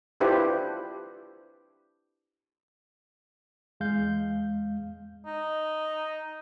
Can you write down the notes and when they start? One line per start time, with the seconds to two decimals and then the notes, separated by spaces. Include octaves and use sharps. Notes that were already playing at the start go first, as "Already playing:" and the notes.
0.20 D4 E4 F4 G4 B4 C5
3.80 E2 G#3 F5 G6
5.26 D#4